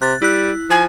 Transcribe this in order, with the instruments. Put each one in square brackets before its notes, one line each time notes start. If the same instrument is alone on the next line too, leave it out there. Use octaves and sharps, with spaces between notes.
[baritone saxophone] C3 [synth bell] F#6 A6
[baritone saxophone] G3 [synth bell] E4 F#6
[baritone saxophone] F3 [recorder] G#5